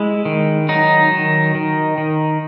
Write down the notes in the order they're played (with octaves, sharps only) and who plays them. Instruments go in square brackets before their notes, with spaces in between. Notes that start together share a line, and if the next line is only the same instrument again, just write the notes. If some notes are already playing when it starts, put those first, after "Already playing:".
Already playing: [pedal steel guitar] G#3 E4
D#3
F#3 D#4
D#3
D#3
D#3